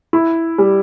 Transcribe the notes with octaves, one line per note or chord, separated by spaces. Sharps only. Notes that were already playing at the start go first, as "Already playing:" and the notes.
E4
G3